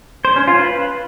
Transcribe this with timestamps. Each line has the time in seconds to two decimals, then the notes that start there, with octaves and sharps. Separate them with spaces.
0.25 C5
0.36 C#4
0.48 F4
0.59 B4